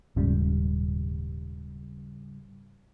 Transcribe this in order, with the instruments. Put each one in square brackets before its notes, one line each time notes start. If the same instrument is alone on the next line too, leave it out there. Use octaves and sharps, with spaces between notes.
[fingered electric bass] D#1 [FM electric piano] G#2 C#3 G3